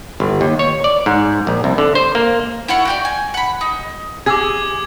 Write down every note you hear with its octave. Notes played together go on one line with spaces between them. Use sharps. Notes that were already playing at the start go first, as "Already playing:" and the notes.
G1
D#2
C#5
D5
G#2
A#1
C2
D3
C5
A#3
E4 F4 F#5 C#6
F#4 G4 D5
G#5
F#5 B5
D#4
G#4 D6 E6 G#6